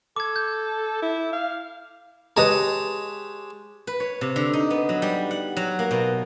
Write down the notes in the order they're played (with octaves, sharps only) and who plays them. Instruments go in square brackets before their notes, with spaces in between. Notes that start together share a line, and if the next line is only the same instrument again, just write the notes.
[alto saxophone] A4 [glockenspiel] D6 G#6
[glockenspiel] G6
[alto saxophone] E4
F5
[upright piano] G#3 G4 [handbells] B4 D#5 A#5 [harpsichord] C#5 A5 D#6
[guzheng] B4
C#5
C3
D3
D#4
B3
F#3
G3
F#5
F#3
A#3
B2